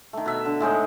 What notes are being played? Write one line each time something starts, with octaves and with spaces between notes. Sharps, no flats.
D#3 A3
B2 E5
D3
A2 G#3 D#4 D#5